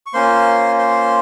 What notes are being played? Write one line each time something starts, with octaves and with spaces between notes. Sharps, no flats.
C#6
A#3 C#4 F4 C5 C6
C5 C6